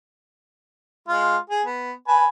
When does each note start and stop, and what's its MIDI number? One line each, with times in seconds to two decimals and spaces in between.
1.08 1.37 56
1.08 1.37 65
1.50 1.63 68
1.65 1.92 59
2.08 2.27 71
2.08 2.27 80
2.08 2.27 81